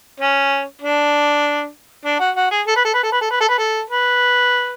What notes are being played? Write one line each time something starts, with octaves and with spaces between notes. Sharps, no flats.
C#4
D4
D4
F#4
F#4
G#4
A4
B4
A4
B4
A4
B4
A4
B4
A4
B4
A4
B4